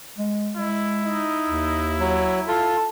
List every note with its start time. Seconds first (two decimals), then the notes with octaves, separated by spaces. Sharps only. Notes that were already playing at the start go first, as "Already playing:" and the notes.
0.18 G#3
0.57 G#3 E4
1.03 D#4
1.50 D#2
1.99 F#3
2.48 F4 A4 A5